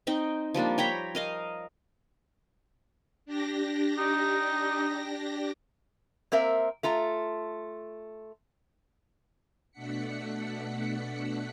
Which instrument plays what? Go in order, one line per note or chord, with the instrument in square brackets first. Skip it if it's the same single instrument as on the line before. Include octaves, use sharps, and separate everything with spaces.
[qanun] C4 D#4 G5
F3 G3 A#3 D4
C#5 G5 A#5 B5
A#4 D#5 F5
[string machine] D4 G4 A#6
[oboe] D#4
[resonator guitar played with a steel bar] A#3 C4 A#4 E5
A3 F4 A#5
[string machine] B2 A3 D4 F#5 B6 C#7